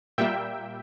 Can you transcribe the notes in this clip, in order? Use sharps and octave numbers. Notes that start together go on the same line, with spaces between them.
A#2 G3 A#3 E5 G5